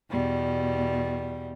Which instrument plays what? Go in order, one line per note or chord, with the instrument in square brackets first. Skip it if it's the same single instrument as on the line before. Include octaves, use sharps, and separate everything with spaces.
[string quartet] E2 B2 G3